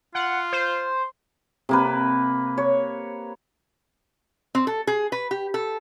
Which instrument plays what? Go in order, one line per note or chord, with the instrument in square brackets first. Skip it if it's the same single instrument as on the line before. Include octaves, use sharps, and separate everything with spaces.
[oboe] F4 [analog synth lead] F#5
[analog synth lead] C5
[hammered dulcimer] C3 A#3 B4
C#5
[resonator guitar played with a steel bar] C4
A4
G#4
B4
G4
A4